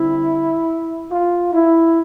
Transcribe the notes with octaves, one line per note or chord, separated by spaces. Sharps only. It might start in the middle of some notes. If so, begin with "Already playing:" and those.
Already playing: D3 G3 C4 E4
F4
E4